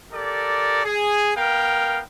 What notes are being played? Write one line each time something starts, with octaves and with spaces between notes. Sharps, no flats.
G4 A4 A#4 D5
G#4
B3 A#4 F5 G5